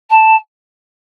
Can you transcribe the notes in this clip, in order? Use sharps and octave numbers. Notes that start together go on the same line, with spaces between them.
A5